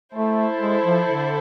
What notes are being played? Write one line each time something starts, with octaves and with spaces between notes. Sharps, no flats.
A3 E4 A4 C5
G#3
F3
D3